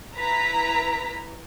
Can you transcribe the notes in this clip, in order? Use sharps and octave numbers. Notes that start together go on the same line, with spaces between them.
E4 B4 A#5 B6